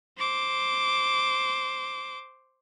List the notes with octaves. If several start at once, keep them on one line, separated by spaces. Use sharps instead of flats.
C5 D6